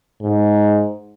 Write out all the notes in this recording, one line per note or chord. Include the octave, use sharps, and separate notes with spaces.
G#2